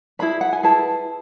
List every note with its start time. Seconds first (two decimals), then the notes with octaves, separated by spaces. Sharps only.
0.19 E4 G#4 B4 B5
0.41 F#5
0.53 G#5
0.63 E4 G#4 B4 A5